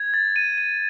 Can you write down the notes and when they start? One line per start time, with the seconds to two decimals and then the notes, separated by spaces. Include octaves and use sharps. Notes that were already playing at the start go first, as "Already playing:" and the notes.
Already playing: G#6
0.14 A6
0.36 D#7
0.58 D#7